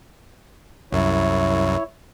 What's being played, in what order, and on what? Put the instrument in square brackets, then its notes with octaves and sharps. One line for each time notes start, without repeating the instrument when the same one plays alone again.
[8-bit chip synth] C2 F#2 [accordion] E4 C#5